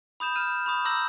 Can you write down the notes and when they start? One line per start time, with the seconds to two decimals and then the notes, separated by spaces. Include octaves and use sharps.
0.20 B5 D#6 G6 E7
0.36 F6 D#7 E7
0.66 B5 C#6 D#6
0.85 A#5 D6 E6 G6 A#6 F#7